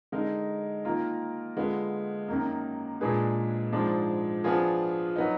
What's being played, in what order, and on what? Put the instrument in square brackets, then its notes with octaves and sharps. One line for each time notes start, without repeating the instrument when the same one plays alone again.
[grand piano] D3 G#3 D#4 A#4
D#3 A#3 F4 A#4
D3 G#3 B3 F4
F#2 D#3 A#3
A#2 G#3 D4 G#4 B4
G#2 F3 G#3 D4
F3 B3 D4 F4 G#4
F#3 B3 D#4